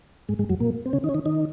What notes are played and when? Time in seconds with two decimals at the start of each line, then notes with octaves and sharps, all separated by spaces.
0.29 G#2 G#3
0.39 G#2 G#3
0.49 F#2 F#3
0.60 A#2 A#3
0.86 C4
0.93 C#3 C#4
1.04 D#3 D#4
1.09 C#4
1.14 D#3 D#4
1.26 D#3 D#4